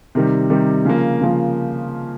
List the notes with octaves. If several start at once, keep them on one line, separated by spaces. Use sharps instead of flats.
C3 D#3 G3
C3 D#3 G3
C#3 F3 A#3
C#3 F3 A#3